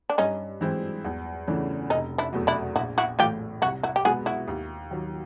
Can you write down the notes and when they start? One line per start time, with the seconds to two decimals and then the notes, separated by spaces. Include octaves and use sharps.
0.10 D4
0.18 G2 C#4 D#4
0.61 E3 G#3 C4 E4
1.05 E2
1.47 C#3 E3 A3 D4
1.90 F1 C#4 D#4
2.18 D4 E4
2.33 E2 B2 F#3 A3
2.47 D4 E4
2.76 A#1 E4 F#4
2.98 E4 F#4
3.19 A2 E3 A3 F4 G4
3.62 C2 E4 F#4
3.83 E4 F#4
3.96 G4
4.05 B2 G#3 B3 F#4 G#4
4.26 E4 F#4
4.48 D#2
4.91 D#3 F#3